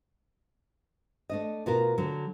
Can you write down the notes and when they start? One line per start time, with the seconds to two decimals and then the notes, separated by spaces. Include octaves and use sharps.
1.29 A3 D4 D#5
1.66 B2 F4 F#4 A#4
1.98 D3 F#3